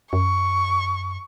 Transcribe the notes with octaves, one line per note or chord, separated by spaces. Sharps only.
F#2 C#6